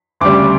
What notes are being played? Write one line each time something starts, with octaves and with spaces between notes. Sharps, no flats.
D2 C#3 G3 D6